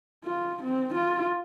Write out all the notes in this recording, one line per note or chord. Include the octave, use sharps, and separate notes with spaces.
F4
C4
F4